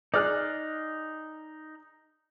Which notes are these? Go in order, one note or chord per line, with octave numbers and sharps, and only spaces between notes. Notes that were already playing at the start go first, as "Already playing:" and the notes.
D#4 G#4 D5 F6 F#6